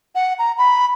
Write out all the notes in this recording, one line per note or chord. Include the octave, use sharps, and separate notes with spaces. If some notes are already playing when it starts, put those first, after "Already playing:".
F#5
A#5
B5